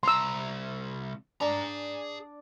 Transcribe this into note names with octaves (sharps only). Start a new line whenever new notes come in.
C2 A#5 C6 E6
D4 G#4 A#5